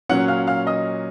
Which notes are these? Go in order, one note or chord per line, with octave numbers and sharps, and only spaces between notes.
A#2 F#3 C#4 F#5 F#6
F5 F6
F5 F6
D#5 D#6